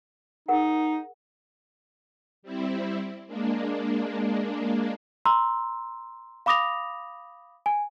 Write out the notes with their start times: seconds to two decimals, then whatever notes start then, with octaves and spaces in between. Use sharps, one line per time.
0.48 D#4 G#4 A#4 F#5
2.43 G3 C4 E4
3.27 G#3 A#3 D4
5.25 A#5 C6 E6
6.46 F5 B5 D6 D#6 A#6 F7
7.66 G#5